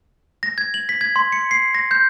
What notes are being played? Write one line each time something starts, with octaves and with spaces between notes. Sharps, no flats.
A#6
G#6
F#7
B6
G#6
C6
C#7
C7
A#6
G6